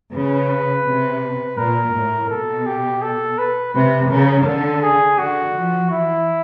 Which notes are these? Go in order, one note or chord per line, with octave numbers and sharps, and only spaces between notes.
C#3 B4
C3
A#2 A#4
A2
B2 A4
G4
A4
B4
C3 B4
C#3 A#4
D3 A4
G#4
D3 F#4
F3
E3 E4